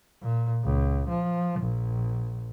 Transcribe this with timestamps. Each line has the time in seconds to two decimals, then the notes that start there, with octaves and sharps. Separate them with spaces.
0.22 A#2
0.64 C#2
1.09 F3
1.61 A#1